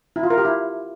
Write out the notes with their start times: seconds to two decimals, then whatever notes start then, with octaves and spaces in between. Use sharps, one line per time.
0.16 E4
0.23 F4
0.30 A#4
0.38 G4
0.45 E4